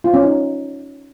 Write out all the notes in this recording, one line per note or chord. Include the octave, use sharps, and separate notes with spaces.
F4
C#4
D#4